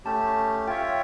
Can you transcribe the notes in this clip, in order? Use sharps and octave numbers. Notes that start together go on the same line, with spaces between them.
A3 C#4 G4 A5
F4 C#5 E5 G5